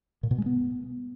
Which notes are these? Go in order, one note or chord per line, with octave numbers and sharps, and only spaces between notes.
A#2
B2
G#3
B3